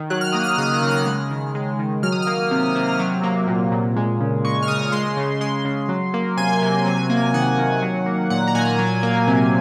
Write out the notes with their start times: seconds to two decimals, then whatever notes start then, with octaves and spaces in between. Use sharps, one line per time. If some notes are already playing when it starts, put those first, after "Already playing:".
Already playing: D#3
0.10 F#3 F#6
0.21 F6
0.32 A#3 D#6
0.43 F6
0.58 C#3 D#6
0.74 F#6
0.82 C#3
0.91 F6
1.07 G#3
1.31 D#3
1.55 G#3
1.79 D#3
2.03 F#3 F6
2.12 D#6
2.22 A#3 F6
2.51 C3
2.75 C3
2.99 F#3
3.23 A#3
3.48 A#2
3.72 A#2
3.96 G#3
4.20 C#3
4.45 G#3 C#6
4.63 F6
4.68 C#3 D#6
4.92 G#3 C6
5.17 C#3
5.41 G#3 C6
5.65 C#3
5.89 F#3
6.14 A#3
6.37 C3 G#5
6.62 C3
6.86 F#3
7.10 A#3
7.34 D#3 F#5
7.58 D#3
7.82 F#3
8.06 A#3
8.30 A#2 F#5
8.47 A#5
8.55 A#2 G#5
8.79 F#3
9.03 A#3
9.27 C3